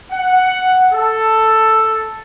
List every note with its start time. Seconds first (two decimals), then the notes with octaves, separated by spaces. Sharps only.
0.11 F#5
0.93 A4